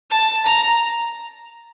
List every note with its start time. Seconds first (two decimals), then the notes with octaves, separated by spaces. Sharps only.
0.11 A5
0.46 A#5